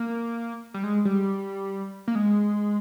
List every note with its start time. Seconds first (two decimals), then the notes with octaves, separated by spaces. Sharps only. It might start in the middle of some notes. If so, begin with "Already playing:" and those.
Already playing: A#3
0.74 G3
0.83 G#3
1.05 G3
2.08 A#3
2.15 G#3